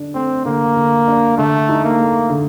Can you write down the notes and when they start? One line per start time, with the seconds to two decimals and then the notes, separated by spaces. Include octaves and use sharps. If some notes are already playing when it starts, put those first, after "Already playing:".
Already playing: D3 D4
0.14 A3 C4
0.45 D3 A#3
0.76 D3
1.08 D4
1.37 D3 A3
1.69 D#4
1.84 A#3
1.99 A3
2.30 D3